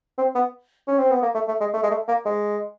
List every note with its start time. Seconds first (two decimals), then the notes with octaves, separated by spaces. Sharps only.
0.18 C4
0.35 B3
0.88 C#4
0.99 C4
1.11 B3
1.22 A#3
1.34 A3
1.48 A3
1.61 G#3
1.74 A3
1.83 G#3
1.91 A3
2.08 A#3
2.26 G#3